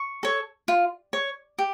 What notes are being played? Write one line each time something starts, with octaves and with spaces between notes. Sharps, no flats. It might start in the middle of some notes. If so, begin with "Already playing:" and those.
Already playing: C#6
A4 C#5
F4
C#5
G4